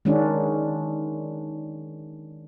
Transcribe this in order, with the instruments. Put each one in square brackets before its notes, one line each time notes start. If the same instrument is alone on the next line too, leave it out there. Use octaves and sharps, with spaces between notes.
[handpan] D#3 G#3 C#4 D4 F#4